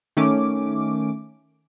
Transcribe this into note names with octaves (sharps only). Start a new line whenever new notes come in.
D#3 A3 C#4 D6